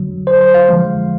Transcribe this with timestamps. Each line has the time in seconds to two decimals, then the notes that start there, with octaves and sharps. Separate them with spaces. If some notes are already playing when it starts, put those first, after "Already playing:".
Already playing: D3 F#3
0.27 C5
0.41 C5
0.54 F5
0.69 D3 F3 G#3